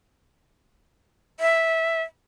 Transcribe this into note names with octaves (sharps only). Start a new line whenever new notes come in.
E5